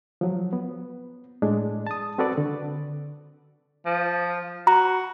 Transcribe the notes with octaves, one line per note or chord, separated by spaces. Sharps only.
F3 F#3
B3
A2 G#3 D4
A5 D#6
C4 F#4 A4 B4 D5
D3
F3
F#4 A#5